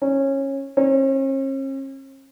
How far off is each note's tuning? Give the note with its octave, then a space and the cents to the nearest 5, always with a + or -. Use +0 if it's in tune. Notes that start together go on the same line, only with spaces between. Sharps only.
C#4 -20
C#4 -45